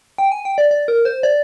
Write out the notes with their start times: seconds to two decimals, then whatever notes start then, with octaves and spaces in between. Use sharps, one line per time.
0.18 G5
0.32 G#5
0.45 G5
0.58 D5
0.71 D5
0.88 A#4
1.05 C5
1.23 D5